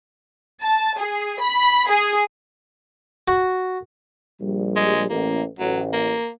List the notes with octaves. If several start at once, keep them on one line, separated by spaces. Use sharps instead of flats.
A5
G#4
B5
G#4
F#4
A#1 G3
G#3
A1 A#3
A1 F#3
A#3